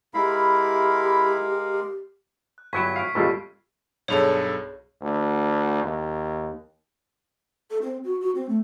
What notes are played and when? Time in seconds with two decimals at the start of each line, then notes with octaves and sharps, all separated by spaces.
0.14 G#3 E4 G4 A#4 F5 B5
2.58 F#6
2.73 G1 F#3 E4 C#6 G#6 B6
2.96 F5 C7 D7
3.15 G#1 D#2 C#3 G3 F4 A4
4.08 B1 G2 G#4 A4 C#5
5.01 D2
5.84 D#2
7.71 A4
7.82 C4
8.04 F#4
8.21 F#4
8.35 C4
8.49 A3